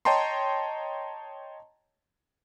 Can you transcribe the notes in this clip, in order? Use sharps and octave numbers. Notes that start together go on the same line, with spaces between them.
C#5 D#5 G5 A5 A#5 C6